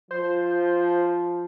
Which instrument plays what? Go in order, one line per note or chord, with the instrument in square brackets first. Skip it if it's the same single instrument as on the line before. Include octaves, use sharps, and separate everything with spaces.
[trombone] F3 [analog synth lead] C5